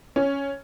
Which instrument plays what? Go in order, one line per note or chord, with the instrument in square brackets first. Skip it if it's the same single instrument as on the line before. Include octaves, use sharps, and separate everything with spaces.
[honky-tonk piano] C#4